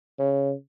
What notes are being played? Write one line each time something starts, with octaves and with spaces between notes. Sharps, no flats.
C#3